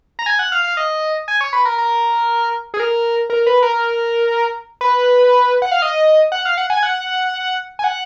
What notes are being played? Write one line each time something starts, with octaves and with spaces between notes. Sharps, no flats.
A#5
G#5
F#5
F5
F5
D#5
G#5
C#5
B4
A#4
A#4
G#4
A#4
A#4
B4
A#4
B4
F#5
F5
D#5
F#5
F5
F#5
G#5
F#5
G#5
F#5